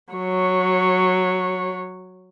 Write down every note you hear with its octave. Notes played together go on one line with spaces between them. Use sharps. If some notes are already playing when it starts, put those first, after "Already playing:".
F#3 C#5